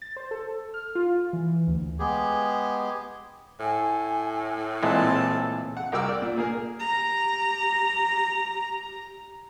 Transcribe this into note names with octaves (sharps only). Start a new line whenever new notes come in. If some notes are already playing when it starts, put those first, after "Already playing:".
A6
C5
A4
F6
F4
E3
D2
G#3 B3 G4 G#4
A2 G#5
A#2 E3 G#3 C4 A4 A5
F#5
C2 F#4 A#4 G5 D6 E6
D5
A#2
A#3 G#4 A#4
G4 A#5